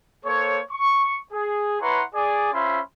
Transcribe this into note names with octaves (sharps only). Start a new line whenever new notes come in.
A#3 A4 C5 C#5
C#6
G#4
E4 B4 C#5 F#5 A#5 C6
G#4 D5 G#5
C#4 F4 C5 E5 B5 C6